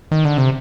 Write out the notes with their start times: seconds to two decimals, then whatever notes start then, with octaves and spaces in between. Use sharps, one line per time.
0.11 D#3
0.25 D3
0.37 C3